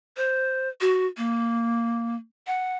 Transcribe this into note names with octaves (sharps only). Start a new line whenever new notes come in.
C5
F#4
A#3
F#5